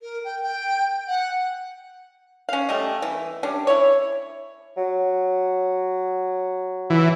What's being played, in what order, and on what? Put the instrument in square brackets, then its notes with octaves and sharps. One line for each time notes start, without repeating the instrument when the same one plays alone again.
[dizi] A#4
G5
G5
F#5
[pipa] C#4 F5
G3 A3 D#5
E3
G3 C#4 D4
E4 C#5
[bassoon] F#3
[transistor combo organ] E3